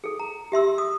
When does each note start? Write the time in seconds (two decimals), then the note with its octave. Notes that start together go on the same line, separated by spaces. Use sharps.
0.04 G#4 A4
0.20 A#5
0.52 G4 E5 C6 E6
0.78 D#6